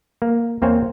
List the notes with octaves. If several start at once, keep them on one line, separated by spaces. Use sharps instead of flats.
A#3
E2 A#3 C4 C5 C#5 G#5